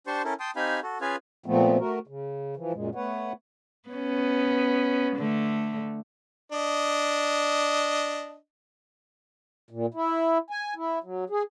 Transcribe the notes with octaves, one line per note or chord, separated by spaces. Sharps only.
D4 G4 C5 A5 C6 C#6
C#4 E4 A4 A#4
G5 A5 C6 D#6
C4 D#4 G4 F5 G#5 B5
F#4 A4
C#4 F4 G#4 B4 F5 G#5
A#2 F3 A3 B3 C4
A3 F#4 A#4
C#3
E3 F3
F#2 A#2 G#3
A3 B3 B4 C#5 F#5
B3 C#4
D3 A3
D4 D#5
A#2
E4
G#5
E4
F#3
G#4